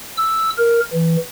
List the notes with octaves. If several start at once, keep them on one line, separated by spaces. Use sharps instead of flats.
E6
A#4
E3